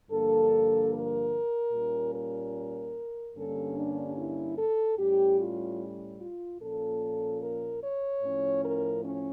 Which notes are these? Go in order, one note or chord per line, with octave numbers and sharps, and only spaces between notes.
G2 D3 F3 A#3 A4
A#4
A#2 G3 A#3 C#4
A#4
G2 D3 G3 A#3 C#4 A4
D4
E4
A4
A2 G3 C#4 G4
F4
F4
A#2 F3 A#3 C#4 A4
A#4
C#5
A2 F3 C#4
A#4
C#4